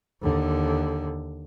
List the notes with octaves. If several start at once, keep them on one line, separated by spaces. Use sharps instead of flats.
D#2 D3